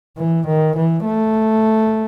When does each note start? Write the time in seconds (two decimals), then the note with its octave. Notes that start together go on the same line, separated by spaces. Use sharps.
0.17 E3
0.47 D#3
0.76 E3
1.04 A3